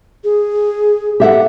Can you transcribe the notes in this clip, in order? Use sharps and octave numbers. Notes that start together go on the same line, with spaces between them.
G#4
G4 A4 E5 F#5